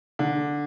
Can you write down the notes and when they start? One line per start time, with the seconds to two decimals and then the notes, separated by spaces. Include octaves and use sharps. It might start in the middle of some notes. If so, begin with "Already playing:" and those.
0.19 D3